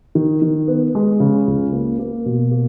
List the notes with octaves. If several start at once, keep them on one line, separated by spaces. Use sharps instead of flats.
D#3
D#3
B3
G#3
C#3
C#2
A#3
A#3
B2
A#3